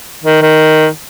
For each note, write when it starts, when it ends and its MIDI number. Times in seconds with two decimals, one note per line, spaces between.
0.24 0.41 51
0.42 0.88 51